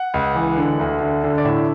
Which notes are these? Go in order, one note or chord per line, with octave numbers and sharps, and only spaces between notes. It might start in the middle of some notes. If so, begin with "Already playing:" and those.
Already playing: F#5
C#2
E3
D3
D2
D3
D3
D5
A2 E5